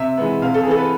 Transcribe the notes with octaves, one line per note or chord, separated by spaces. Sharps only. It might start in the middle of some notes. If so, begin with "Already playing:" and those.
Already playing: C3 E5
E3 G#3 B3
C3 F5
A4
G#4
E3 B3 A4
B4